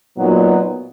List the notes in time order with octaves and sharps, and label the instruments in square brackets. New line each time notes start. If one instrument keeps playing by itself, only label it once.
[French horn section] A#2 F#3 B3 D#4 F#4